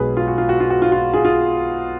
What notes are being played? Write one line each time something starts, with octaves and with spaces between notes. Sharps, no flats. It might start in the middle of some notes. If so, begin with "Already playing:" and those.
Already playing: B1 B2 G#3 G#4 B4
F4
F#4
F4
F#4
F4
F#4
F4
F4
F4 G#4
F4 G#4